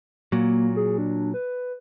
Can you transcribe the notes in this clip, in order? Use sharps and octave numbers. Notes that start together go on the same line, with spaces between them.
A#2 F#3 A#3
G#4
D4
B4